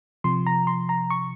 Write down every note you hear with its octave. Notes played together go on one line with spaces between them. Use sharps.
C3 F3 C6
A#5
C6
A#5
C#6